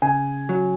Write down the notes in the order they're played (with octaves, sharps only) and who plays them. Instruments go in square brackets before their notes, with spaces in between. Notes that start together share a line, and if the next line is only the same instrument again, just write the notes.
[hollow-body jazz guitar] C#3 [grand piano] G#5
[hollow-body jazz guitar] F#3